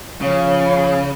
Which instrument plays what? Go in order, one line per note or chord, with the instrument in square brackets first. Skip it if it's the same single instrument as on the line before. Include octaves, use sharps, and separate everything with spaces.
[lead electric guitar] C#3 [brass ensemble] F3 C#5 F5